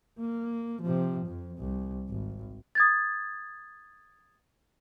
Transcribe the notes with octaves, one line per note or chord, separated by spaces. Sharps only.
A#3
C3 F3
F2
C2
G#1
D#6 G#6 A6